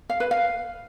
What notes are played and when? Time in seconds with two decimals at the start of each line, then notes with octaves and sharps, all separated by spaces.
0.10 F5
0.20 B4
0.31 F5